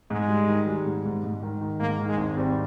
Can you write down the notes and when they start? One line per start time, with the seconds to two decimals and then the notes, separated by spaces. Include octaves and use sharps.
0.11 G#2 G#3
0.29 G3
0.48 D#3
0.67 G3
0.86 G#2
1.05 G#2
1.24 G#2
1.42 D#3
1.61 D#3
1.80 G#2 A#3
1.99 D#3
2.09 G#3
2.17 G#1
2.36 G3 C4